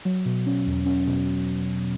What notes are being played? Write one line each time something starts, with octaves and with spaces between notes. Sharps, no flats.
F#3
B2
C#4
E2
C#4
B2